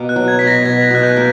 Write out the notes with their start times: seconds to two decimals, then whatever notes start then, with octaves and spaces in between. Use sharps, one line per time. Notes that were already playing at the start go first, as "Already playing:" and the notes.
Already playing: B2 A#3
0.09 F#6
0.16 F#3
0.28 G#6
0.39 B2 B6
0.47 A#6
0.65 B2 G#6
0.91 B2 F#6
1.03 G6
1.17 A#3